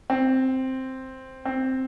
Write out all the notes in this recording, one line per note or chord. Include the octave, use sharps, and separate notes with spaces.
C4
C4